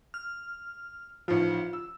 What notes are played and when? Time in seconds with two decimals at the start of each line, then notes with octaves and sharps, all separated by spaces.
0.14 F6
1.28 A1 D#3 F3 F4
1.73 E6